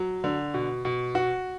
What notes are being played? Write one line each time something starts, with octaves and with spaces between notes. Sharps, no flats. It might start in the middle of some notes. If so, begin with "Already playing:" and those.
Already playing: F#3
D3
B2
B2
F#4